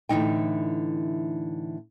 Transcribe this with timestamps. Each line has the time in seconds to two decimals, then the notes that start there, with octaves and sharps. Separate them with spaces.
0.09 A2 D3 E3 F#3 D#4 G5